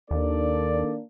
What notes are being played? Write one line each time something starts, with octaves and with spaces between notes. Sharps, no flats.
D#2 D#3 A#3 D4 A4 D5